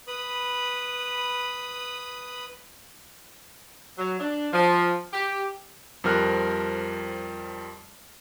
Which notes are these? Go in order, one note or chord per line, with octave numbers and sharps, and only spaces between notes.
B4 B5 D#6
F#3
D4
F3
G4
F2 F3 G3 A#4 F6 F#6